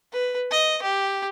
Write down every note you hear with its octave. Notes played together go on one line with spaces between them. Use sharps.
B4
D#5
G4